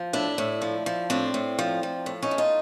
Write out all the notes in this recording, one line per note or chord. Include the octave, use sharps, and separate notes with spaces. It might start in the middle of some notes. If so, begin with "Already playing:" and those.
Already playing: F3
A2 D4 E4
A2
F3
F3
A2 C4 D4
A2
F3
F3
A2
C#4 D#4
A2
D#4 F4